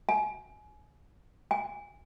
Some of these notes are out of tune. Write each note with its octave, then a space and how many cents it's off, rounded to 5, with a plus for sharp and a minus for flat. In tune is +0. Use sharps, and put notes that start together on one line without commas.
G#5 +25
G#5 -25